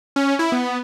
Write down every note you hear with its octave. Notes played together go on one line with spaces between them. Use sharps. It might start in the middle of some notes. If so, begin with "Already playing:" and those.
C#4
E4
B3